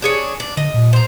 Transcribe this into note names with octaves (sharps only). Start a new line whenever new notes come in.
D4 G#4 C#5
D4
D3 D#5
A#2
C5 A#5